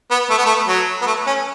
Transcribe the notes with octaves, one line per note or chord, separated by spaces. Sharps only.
B3
A3
B3
A3
F#3
B3
A3
C#4